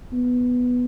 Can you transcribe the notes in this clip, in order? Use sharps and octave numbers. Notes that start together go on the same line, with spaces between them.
B3